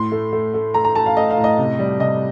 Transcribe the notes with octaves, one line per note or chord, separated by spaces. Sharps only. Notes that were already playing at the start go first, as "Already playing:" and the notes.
Already playing: A2 C6
A3
A3
A3
A3 A#5
A#5
A3 A5
F5
A3 D#5
F5
A2
D#5
C3
G3
C3 D#5